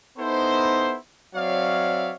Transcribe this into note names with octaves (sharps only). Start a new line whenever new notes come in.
B3 D#4 E4 A4 C5
F#3 C4 C#5 D5 E5 F5